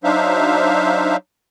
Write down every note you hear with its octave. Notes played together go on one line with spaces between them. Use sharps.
F#3 D4 D#4 C5 E5 F5